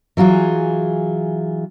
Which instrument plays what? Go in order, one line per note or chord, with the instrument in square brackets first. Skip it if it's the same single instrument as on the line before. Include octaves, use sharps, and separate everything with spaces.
[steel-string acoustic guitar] E3 F#3 F4 G#4